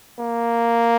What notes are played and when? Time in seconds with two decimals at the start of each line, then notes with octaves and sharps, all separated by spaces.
0.20 A#3